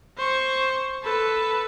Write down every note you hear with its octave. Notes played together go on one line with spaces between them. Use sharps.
C5 C#6
A4 B4